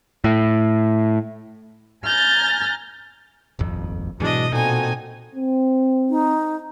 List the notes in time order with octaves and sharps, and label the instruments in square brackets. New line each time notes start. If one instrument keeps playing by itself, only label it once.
[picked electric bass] A2
[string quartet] G#5 A#5 F6 G6 A6 A#6
[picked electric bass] D#1 G#1 F2
[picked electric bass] G#2 E3 F#3 [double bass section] B2 [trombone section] G#3 [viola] D4 D#5
[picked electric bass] A#2 [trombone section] C4 F#4 A4 [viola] D#4 G#5
[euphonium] C4
[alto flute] D#4